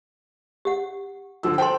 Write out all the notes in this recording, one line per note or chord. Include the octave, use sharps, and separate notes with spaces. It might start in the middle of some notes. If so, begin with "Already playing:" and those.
G4 F#5
D3 F3 E6
A4 C5 G5 C6